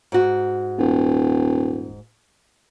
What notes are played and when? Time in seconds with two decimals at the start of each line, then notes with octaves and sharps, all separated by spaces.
0.12 G#2 F#4
0.79 D#1